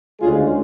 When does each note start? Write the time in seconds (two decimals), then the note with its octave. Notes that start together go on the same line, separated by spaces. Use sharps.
0.19 D2 C#3 G#3 F4 G#4